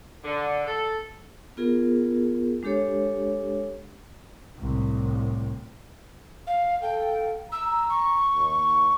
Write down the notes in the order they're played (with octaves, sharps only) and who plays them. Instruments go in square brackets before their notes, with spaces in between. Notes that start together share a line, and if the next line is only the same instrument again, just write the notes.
[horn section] D3
A4
[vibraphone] B3 F4 G#4 A#4
G#3 D4 G4 A4 C#5
[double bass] C2 A2
[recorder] F5
[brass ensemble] A4 F5 [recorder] G5
[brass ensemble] A#5 [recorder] E6
[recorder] C#6
[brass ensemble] D#2